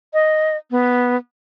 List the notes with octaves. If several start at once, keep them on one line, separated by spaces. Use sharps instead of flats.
D#5
B3